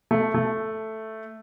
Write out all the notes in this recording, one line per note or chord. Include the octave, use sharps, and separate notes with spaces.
A3
A3